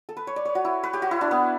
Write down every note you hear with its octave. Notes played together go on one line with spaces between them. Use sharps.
A4
B4
C#5
D5
C#5
F#4
E4
B4
G4
F#4
E4
D4
B3